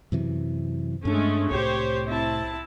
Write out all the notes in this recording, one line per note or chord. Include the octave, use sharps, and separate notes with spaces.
F#2 C3 E3
G2 G#3 A3 C#4 D4
C2 A2 G4 C5 C#5
C4 E4 A5